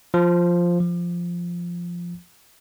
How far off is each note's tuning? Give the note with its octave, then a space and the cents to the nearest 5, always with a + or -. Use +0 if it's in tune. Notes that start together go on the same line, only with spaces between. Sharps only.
F3 +0
F3 -5